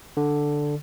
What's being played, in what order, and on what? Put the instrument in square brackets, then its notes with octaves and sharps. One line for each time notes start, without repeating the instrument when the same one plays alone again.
[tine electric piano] D3